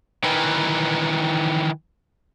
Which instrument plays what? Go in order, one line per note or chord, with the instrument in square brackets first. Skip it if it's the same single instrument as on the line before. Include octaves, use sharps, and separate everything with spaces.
[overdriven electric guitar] D#3 E3